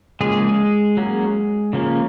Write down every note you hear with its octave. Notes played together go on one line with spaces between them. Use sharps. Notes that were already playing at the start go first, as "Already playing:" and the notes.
C#3 F3 G#3 A#3 C#4 G#4
F#3 A#3 C#4
C#3 F3 A#3 C#4